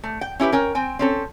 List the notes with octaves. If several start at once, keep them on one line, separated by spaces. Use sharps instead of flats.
A3
G5
C#4 E4 G4 B4
C#4 A#4 G5
C4 G5 G#5
C4 C#4 A4